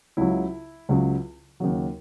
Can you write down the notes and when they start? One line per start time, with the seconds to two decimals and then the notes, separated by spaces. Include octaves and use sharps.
0.17 C#2 C#3 F#3 E4
0.89 C#2 C#3 F#3
1.60 D#2 C#3 F#3